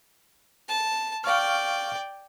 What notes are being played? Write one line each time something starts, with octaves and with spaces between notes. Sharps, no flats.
A5
D5 F5 G5 C#6 F6